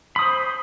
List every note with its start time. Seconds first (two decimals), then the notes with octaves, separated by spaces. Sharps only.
0.16 B5
0.19 D#6
0.22 C5